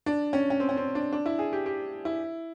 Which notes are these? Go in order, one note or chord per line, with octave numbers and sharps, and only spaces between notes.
D4
C#4
C#4
C4
C#4
C4
D4
D4
E4
G#4
G4
G4
E4